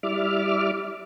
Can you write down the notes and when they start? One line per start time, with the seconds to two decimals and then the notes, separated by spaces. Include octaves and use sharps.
0.03 G3 E4 D5 E5 D6 F6